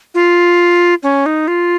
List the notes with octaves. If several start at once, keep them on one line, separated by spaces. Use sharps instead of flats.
F4
C#4
D#4
F4